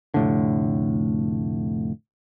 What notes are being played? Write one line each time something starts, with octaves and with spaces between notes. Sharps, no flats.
F1 A2 D3